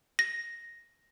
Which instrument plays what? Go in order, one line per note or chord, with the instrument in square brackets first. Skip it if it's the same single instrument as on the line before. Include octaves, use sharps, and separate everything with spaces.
[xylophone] A#6